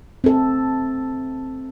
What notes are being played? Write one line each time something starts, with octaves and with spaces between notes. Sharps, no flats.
C4 A4